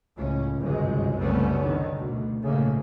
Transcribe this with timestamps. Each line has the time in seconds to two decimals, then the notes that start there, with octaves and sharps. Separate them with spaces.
0.16 C#2 A2 C#4
0.60 G1 C#2 F#2 C3 G#3
1.18 F#1 C2 G3 A3 B3 C#4
1.61 D3 D#3
1.96 D2 B2
2.42 A#1 G#2 C#3 A3 A#3